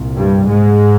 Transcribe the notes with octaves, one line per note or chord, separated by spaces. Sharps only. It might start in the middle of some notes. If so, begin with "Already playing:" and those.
Already playing: C2 A#2
G2 G3
G#2 G#3